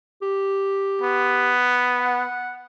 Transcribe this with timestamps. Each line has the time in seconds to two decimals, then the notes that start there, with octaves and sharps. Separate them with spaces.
0.22 G4
1.01 B3
1.99 F#5